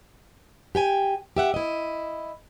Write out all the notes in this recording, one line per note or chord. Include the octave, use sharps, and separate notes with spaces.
G4 G5 G#5
G4 E5 F#5
E4 D#5